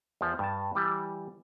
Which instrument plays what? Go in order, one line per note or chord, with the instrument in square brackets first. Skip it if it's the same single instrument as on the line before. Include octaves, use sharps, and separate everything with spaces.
[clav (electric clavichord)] E2 F3
G2 A5
E3 G3